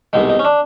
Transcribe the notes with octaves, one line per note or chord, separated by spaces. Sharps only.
C2 B2 G#3 D#4
D#4
C#4
D4